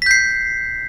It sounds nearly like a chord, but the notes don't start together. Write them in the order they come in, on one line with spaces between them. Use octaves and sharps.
B6 G6 C7